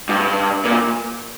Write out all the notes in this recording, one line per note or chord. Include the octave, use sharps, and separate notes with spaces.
G2
A#2